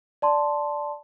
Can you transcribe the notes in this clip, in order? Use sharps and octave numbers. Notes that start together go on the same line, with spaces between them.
D5 A5 C6